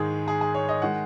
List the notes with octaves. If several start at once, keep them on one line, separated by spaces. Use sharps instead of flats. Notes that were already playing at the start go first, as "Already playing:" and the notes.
Already playing: G#2 D#3 G#3 G#4
G#4
G#4
C#5
D#5
D#3 G#3 F#5